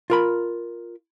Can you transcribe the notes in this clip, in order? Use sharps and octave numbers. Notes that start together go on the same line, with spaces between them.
F4 A#4 B5